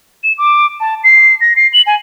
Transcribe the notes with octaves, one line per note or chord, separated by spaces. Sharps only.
E7
D6
A5
C7
A#6
C7
F#7
G#5